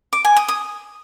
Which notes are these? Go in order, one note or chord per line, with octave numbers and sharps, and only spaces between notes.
D6
G#5
D#6
D#6